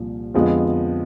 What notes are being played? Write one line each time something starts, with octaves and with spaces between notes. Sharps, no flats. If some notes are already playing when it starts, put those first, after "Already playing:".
Already playing: C2 A#2 F3
F2 D3 F3 G#3 B3